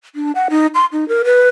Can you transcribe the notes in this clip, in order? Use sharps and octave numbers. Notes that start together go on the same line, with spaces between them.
D4
F#5
D#4
C6
D#4
A#4
B4